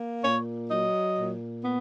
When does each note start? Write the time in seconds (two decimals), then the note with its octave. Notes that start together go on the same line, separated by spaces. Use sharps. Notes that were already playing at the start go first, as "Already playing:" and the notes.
Already playing: A#3
0.22 A#2 C#5
0.69 F#3 D#5
1.16 A#2
1.63 B3